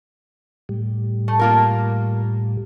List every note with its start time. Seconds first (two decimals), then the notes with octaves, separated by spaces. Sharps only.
0.69 A2 G3
1.28 A3
1.39 A#3 F4 A#4